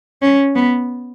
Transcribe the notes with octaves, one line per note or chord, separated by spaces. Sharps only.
C#4
B3